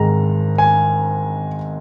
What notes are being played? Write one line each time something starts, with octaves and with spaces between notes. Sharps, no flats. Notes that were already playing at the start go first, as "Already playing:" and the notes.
Already playing: G#1 G#2 D#3 G#3 A#5
G#5